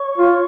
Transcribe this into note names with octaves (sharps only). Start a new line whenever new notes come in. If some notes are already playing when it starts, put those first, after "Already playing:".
Already playing: C#5
F4